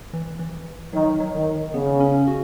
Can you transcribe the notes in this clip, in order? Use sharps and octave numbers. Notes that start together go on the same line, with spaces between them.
E3
E3
D#3 F#3
F#3
D#3
C#3 B3
C#4
F#4